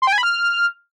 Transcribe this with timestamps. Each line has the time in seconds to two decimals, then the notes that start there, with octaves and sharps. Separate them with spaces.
0.02 C6
0.07 G5
0.13 G#5
0.18 B5
0.23 F6